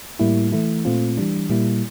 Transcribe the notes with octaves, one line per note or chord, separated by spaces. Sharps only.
A2 G3 A#3 E4
E3 A3 E4
A#2 A3 C4 F4
E3 G3 D4
A#2 G3 A#3 E4